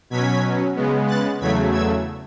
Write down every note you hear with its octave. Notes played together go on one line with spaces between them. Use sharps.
B2 F#3 C#4 G#6 B6
C#3 G#3 B3
F#6 A6
E2 C#3 F#3 A3 G#6 B6
E6 G#6